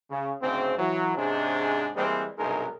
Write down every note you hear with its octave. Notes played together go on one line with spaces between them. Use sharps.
C#3
D2 G#2 C#3 C4
E3 F#3
G#2 C3 G#3 C#4 D4
E3 G3 G#3 A#3 C4
B1 G2 C3 G#3 D#4 A#4